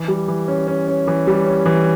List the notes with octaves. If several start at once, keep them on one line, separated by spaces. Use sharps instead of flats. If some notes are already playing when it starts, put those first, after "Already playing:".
Already playing: E3
G3
E3
C#4
C#4
C#4
E3
G3
C#4
E3